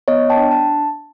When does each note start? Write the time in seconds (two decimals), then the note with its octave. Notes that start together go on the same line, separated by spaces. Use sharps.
0.08 B3 C#5 D#5
0.30 G5 A5
0.37 D4
0.51 A5